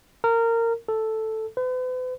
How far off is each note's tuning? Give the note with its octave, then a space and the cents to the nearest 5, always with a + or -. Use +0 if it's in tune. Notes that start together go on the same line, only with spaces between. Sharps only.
A#4 -20
A4 +0
B4 +45